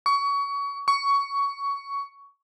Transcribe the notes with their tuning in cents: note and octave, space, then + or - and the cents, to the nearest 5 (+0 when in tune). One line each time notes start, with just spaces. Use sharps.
C#6 +25
C#6 +15